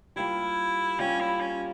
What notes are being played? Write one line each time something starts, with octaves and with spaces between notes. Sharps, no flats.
G3 A#3 E4 F4
G3 A#3 C#4 F4
E4
C#4